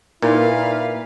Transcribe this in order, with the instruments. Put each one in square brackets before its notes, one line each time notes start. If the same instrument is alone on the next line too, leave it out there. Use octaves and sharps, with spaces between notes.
[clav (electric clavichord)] A#2 [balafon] D#4 A#4 [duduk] E4 [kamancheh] B4 F5